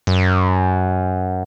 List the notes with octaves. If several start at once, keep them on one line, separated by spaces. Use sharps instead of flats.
F#2